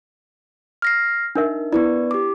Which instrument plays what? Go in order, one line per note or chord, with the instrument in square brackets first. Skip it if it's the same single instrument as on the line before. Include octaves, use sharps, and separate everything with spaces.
[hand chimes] F6 A#6 C7
[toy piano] D4 A#4 E5 [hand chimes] D#4
[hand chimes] B3 B4 D5 [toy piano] E4
[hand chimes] G4 D6